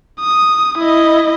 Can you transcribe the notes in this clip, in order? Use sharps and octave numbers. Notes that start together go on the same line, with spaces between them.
D#6
E4 D#5